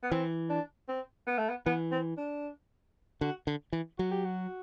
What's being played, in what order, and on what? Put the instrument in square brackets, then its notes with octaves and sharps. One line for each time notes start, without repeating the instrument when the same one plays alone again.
[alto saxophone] B3
[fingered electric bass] E3 [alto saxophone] C4
[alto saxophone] D4
C4
B3
A3
B3
[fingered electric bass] E3 [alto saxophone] B3
[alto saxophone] C4
D4
[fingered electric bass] D3 [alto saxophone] F#4
[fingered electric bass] D3
E3
[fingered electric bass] F#3 [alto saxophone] F#4
[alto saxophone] G4
F#4